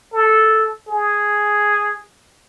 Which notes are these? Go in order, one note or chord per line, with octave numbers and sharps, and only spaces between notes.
A4
G#4